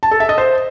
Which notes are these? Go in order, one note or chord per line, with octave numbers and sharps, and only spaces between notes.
A5
A4
E5
D#5
C5